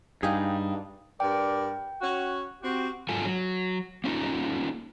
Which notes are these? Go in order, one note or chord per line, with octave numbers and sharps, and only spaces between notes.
G2 D#4 G#4 F5 G5 D#6
G2 A#4 D5 G5
C#4 F#4
C4 F#4 G4
G#2 F#3 F4 A4 G#5
F#3
A#3 C#4 D#4 F4